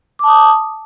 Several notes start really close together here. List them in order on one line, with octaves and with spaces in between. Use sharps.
D6 A5 D#6